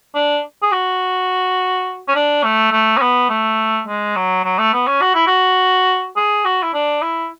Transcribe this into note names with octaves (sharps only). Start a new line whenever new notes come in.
D4
G#4
F#4
C#4
D4
A3
A3
C#4
B3
A3
G#3
F#3
F#3
A3
B3
C#4
F#4
E4
F#4
G#4
F#4
E4
D4
E4